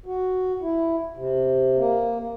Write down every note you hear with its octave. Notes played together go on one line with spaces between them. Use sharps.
F#4
E4
C3
A#3